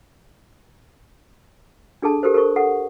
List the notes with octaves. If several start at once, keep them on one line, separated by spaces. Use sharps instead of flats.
D4 G#4 A4 A5
G4 A4 A#4 C5
A4 A#4 C5 C#6
A4 F#5